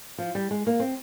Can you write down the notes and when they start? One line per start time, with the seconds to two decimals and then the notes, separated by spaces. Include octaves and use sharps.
0.18 F3
0.35 G3
0.51 G#3
0.67 A#3
0.80 C4